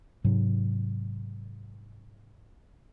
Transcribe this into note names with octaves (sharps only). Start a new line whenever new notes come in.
G#2 C3 F#3